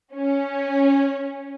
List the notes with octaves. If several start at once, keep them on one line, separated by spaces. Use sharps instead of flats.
C#4